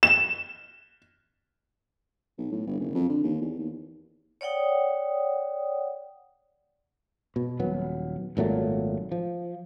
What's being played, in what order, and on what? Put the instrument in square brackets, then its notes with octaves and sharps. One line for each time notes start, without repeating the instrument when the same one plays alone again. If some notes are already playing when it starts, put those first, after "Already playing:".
[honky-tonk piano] E7
[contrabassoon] B1
A2
G1
F#1
F2
D3
D#2
E2
D#2
[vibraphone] C#5 D5 F#5 G5 D#6
[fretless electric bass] B2
D#1 F#3 B3
G#1 A#2 F#3 A3
F3